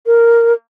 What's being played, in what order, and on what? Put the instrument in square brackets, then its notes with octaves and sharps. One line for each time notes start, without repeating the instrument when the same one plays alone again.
[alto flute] A#4